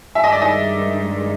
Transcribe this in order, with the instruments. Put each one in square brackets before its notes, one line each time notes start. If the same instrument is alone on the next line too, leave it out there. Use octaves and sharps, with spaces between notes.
[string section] G2 D#3 G#3 [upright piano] E5
[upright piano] D#5
D5
D#4 D#5